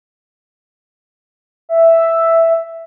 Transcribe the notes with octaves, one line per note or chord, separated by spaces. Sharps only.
E5